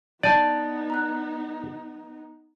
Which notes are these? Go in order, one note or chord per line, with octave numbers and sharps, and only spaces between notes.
B3 D#4 D5 A5 G6 D#7
A#5 F#6